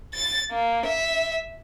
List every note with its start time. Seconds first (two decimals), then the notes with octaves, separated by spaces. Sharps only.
0.14 A6
0.51 A#3
0.86 E5